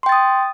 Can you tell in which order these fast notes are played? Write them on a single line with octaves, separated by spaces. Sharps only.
C6 G5 A6 D#6